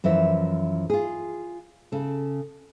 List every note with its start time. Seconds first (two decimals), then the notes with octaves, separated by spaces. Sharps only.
0.04 F#2 E3 F3 E5
0.90 F4 G#4
1.92 C#3 A4